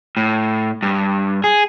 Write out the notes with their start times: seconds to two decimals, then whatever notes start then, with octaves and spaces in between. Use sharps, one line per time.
0.17 A2
0.83 G2
1.44 G#4